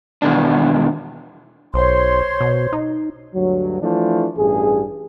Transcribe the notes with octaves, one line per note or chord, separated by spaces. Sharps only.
E2 B2 D#3 D4
B1 C5 C#5 C6
B2
D#4
D2 G2 F#3
E3 F3 A3 D4 E4
A1 G2 G#4